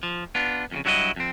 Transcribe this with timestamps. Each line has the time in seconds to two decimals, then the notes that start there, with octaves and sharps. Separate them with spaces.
0.03 F3
0.35 B3 D4 F4
0.71 F2 A2 C#3
0.85 G2 F#3 E4 F#4 A#4 D#5
1.16 F2 C4